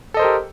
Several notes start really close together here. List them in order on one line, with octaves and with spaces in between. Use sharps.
A4 D#5 C5 A#4 G4